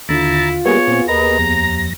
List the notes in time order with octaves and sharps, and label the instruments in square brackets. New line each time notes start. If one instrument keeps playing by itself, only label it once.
[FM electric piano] D#2 D3 [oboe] E4 [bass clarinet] F4 [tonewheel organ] A#5 A6
[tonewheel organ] G3 A#3 [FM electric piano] B3 G#4 [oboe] C#5
[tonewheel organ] A#2 C4
[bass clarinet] D#2 [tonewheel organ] A#4 B4 D#5 [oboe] A#5
[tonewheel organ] F2 A#6